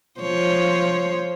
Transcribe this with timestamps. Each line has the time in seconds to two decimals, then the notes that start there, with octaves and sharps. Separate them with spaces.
0.20 F3 C5 C#5